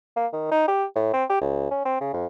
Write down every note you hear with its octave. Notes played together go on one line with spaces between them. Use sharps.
A#3
D#3
D#4
G4
A2
C4
G4
C#2
C#4
C4
C#3
F2